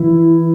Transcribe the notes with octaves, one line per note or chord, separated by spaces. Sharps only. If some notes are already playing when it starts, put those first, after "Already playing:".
Already playing: E3 E4